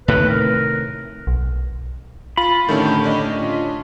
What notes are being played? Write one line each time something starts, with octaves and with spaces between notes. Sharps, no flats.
A2 C3 D#3 B4
A#4
B1
F4 B5
A2 D3 D#3 A3 C#4 G4
C#4 D4 D#5
F4